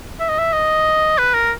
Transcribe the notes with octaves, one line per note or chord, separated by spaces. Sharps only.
E5
D#5
E5
D#5
B4
A#4